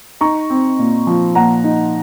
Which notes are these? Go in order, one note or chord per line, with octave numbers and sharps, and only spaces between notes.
D#4 A#5 C#6
C4
A#2
F3
A#2 F#5 A#5
D#4